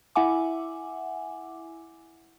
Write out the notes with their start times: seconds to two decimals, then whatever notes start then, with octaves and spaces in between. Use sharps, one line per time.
0.16 E4 E5 F#5 G#5 D6